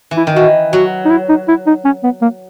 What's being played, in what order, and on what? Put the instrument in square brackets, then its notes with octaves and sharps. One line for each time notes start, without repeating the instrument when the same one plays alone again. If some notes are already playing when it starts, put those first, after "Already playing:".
[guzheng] E3
[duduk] E4
[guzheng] D#3
[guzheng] E3 [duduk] F#4
[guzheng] F#3 [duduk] F#4
[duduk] D#4
E4
D#4
E4
D#4
C#4
B3
A#3